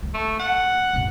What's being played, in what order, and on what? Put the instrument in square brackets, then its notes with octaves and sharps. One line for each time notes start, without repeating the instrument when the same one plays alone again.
[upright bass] A#3
[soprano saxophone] A3
F#5
[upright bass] F#2 B2